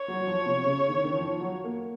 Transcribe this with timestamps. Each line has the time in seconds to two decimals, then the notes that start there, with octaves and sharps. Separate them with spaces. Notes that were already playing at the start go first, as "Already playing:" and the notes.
Already playing: C#5
0.08 F#3
0.21 F#3
0.26 F3
0.46 C3
0.64 C#3
0.89 D#3
1.04 D#3
1.15 F3
1.40 F#3
1.64 A#3